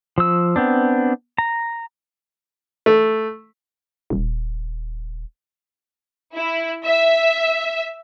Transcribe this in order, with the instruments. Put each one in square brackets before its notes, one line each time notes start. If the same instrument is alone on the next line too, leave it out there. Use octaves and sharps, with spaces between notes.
[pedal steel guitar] F3 E6
B3 C4 D4
A#5
[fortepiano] A3
[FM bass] D#1
[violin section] E4
E5